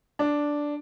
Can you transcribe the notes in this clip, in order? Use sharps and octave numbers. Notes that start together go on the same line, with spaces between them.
D4